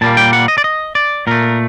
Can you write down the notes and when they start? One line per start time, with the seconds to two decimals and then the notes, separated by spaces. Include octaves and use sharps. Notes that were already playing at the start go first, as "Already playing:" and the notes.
0.01 A#2 G3 A#3 A5
0.17 G5
0.33 F#5
0.48 D#5
0.58 D5
0.64 D#5
0.95 D5
1.27 A#2 A3 A#4